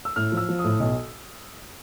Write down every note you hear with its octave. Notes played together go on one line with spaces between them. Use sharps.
E6
A2 F6
F3
E6
F3
A2 D#6
B1